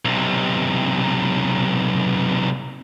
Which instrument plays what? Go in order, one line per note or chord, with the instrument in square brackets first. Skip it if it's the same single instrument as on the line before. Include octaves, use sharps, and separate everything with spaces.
[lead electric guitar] B1 C3